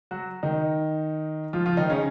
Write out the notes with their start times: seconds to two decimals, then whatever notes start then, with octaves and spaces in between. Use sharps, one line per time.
0.11 F#3 F#4
0.43 D#3 D#4
1.53 F3 F4
1.66 F3 F4
1.77 D#3 D#4
1.90 C#3 C#4